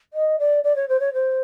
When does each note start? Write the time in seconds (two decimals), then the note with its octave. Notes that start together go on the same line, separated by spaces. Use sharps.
0.13 D#5
0.39 D5
0.64 D5
0.76 C#5
0.89 C5
1.00 C#5
1.14 C5